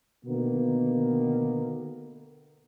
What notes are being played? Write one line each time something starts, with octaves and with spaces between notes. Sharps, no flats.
B2 D3 D#3 A#3 B3